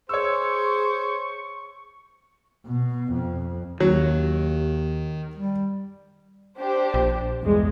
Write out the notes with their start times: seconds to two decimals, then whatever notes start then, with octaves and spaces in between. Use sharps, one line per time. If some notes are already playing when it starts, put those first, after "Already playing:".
0.09 G#4 C5 C#5 C#6 E6
2.66 B2
3.12 F2
3.80 D#2 D#3 F#3
5.35 G3
6.58 D4 G4 C5
6.94 A#1
7.41 E2 G2 G#3